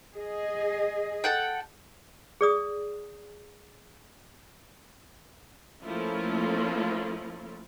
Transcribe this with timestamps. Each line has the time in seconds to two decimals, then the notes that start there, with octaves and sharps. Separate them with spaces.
0.14 G#4 D#5
1.24 A4 F#5 G5
2.41 G#4 D5 D#6
5.84 F3 A3 A#3 C#4 E4 F4